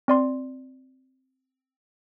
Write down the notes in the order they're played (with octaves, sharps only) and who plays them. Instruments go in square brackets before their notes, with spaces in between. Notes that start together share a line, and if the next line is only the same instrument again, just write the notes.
[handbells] C4 D5 C6